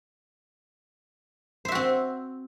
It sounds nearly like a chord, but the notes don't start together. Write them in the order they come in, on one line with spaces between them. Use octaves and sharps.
C5 E5 F#4 C4